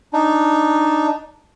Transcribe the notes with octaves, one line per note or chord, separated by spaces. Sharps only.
D4 D#4